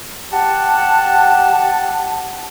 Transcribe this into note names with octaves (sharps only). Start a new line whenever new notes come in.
G4 F#5 A5